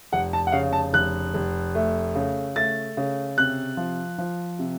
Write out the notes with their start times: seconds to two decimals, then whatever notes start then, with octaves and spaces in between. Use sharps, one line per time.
0.12 F1 F#5
0.33 A5
0.47 F#5
0.52 C#3 F5
0.73 A5
0.93 F1 F#6
1.34 F1
1.75 A3
2.15 C#3
2.56 A3 A6
2.97 C#3
3.37 C3 F#6
3.77 F3
4.18 F3
4.59 C3